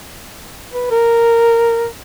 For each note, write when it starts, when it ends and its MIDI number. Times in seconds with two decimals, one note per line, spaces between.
0.73 0.89 71
0.91 1.86 70